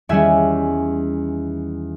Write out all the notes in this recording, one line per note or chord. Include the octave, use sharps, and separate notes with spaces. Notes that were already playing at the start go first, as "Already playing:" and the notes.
E2 D#3 G3 C#4 E5 G#5